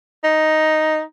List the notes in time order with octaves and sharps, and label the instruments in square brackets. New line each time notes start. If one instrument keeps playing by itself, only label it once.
[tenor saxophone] D#4